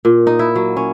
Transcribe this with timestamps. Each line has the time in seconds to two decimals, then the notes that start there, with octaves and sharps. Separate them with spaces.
0.05 A#2
0.27 D#4
0.39 E4
0.56 F#3
0.77 C#4